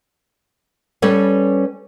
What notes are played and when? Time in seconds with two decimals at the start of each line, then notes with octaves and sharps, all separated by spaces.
1.02 G3 C#4 A4 B4 C#5